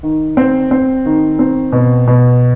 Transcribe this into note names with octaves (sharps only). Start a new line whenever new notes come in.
D#3
C4
C4
D#3
C4
B2
B2